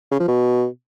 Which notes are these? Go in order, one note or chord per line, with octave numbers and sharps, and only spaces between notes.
C#3
F3
B2